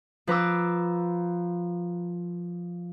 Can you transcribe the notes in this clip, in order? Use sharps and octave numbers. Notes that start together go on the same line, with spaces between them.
F3 B4 A#5 D6 E6